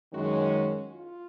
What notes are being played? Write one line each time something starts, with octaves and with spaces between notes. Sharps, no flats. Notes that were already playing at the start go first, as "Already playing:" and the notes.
F#2 D#3 G#3 C#4 F#4
F4